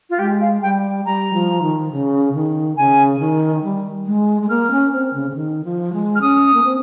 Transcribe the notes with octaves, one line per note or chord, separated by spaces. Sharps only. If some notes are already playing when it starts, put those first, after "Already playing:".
F4
G#3 G4
F5
G3 G5
G3 A#5
F3
D#3
C#3
D#3
C#3 G#5
D#3
G3
G#3
G#3
A#3 F6
C#4
C4
C#3
C#3
D#3
F3
G#3
F6
C#4 D#6
A#3
C4